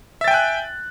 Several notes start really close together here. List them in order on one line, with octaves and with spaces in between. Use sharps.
E5 A6 G5 G#5 F#6